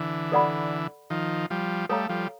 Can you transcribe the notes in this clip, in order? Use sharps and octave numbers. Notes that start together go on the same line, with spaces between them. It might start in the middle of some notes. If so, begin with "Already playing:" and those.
Already playing: D3 E3
A4 D5 F#5 B5
D#3 F3
F3 G3
G3 A3 A4 C#5 F5 A#5
F3 G3